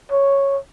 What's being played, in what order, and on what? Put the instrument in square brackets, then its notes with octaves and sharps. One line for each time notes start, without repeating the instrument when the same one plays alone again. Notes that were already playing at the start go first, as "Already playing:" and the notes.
[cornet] C#5